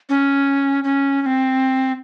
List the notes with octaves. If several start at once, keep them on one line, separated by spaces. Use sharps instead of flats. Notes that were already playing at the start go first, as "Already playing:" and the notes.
C#4
C#4
C#4
C4